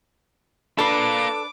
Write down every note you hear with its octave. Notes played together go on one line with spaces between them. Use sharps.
A#3 D4 F4 A4 B4 D6